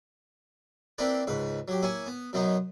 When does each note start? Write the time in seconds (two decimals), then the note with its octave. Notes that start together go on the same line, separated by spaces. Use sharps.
0.98 A#3 C4 D4 E4 B4 G5
1.27 C#2 G#2 B4
1.68 F#3 G4
1.83 A#3 E4 C#5 G#5
2.06 B3
2.33 F#2 B2 F#3 B3 D#4